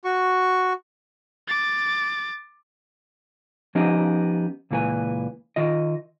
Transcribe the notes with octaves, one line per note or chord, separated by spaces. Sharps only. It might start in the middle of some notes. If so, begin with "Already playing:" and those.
F#4 C#6
D6 A6
F3 B3 C#4 D#4 G4 D#5
C#2 A#2 E3 A4 B4 G#5
D#3 F4 D#5